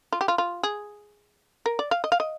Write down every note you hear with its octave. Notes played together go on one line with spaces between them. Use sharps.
F4
G4
F4
F4
G#4
A#4
D5
F5
D#5
F5
D#5